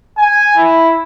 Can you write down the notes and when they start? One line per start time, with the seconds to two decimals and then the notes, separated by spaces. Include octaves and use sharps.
0.18 G#5
0.57 E4